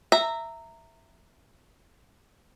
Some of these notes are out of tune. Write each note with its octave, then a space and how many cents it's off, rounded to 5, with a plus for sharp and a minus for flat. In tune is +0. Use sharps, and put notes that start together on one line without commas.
E5 +0 A#5 -15